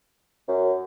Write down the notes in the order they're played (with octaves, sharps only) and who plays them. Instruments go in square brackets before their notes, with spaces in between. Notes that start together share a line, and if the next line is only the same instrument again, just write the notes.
[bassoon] F#2